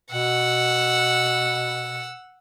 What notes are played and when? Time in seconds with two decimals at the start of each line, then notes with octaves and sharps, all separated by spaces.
0.11 B2 F#5 E6